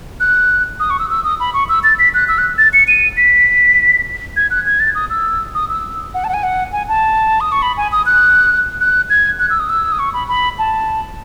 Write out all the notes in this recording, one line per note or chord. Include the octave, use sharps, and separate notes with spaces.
F#6
D#6
C#6
E6
E6
D#6
B5
C#6
E6
A6
B6
F#6
E6
F#6
A6
C#7
D#7
B6
G#6
F#6
G#6
A6
D#6
E6
D#6
E6
F#5
A5
F#5
G#5
F#5
G#5
A5
D#6
C#6
B5
G#5
D#6
F#6
F#6
G#6
F#6
E6
D#6
E6
D#6
C#6
B5
B5
A5